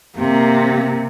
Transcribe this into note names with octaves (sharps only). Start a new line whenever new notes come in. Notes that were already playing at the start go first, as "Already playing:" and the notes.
C3 A#3